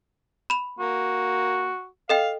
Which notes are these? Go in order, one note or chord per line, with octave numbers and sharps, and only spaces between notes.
B5 F7
A#3 F#4
A4 D#5 F5 G5